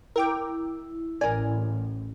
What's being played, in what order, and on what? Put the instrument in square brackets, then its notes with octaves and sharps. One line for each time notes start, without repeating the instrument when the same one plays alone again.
[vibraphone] E4 [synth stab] A#4 G5 D6
[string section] A1 [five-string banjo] A#4 D5 [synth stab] G#5